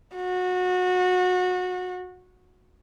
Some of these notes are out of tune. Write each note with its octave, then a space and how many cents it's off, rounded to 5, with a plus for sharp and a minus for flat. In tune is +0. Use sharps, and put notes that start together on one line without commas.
F#4 -25